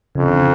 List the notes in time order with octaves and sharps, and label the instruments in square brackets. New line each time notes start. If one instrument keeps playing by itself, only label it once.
[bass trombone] F2 [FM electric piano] C#3
[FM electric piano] D3
C#3